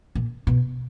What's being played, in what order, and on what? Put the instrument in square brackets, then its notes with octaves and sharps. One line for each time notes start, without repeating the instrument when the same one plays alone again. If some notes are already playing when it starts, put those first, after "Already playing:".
[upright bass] A#2
B2